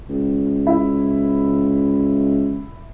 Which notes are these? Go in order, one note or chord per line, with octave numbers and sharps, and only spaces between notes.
C#2
E4